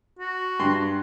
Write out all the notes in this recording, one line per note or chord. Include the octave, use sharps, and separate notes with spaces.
F#4
G2 C6